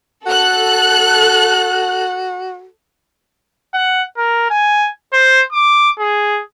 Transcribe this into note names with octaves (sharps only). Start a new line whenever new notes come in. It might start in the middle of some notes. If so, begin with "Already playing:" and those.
F#4 A4 F#6
F#5
A#4
G#5
C5
D6
G#4